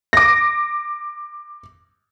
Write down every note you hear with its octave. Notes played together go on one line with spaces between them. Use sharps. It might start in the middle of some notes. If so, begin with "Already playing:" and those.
D6 A#6